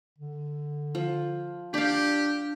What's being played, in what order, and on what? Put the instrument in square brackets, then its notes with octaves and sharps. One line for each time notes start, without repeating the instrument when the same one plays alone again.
[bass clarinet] D3
[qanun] F3
[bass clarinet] D4 [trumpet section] G4 [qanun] D5 F5